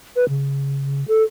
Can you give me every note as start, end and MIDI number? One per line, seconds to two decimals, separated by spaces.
0.16 0.25 71
0.29 1.04 49
1.08 1.23 69